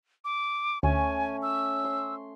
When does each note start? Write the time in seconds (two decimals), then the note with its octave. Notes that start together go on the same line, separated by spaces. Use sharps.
0.25 D6
0.83 D2 A3 C#4 G#5
1.42 E6
1.84 C6